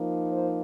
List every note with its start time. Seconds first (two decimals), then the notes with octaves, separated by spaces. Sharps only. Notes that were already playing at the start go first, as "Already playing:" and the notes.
Already playing: F3 A#3 D#4
0.32 C5